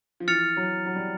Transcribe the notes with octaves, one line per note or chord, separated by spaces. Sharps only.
F3
E3 F6 A6 C#7 F7
F#3
F#3
G3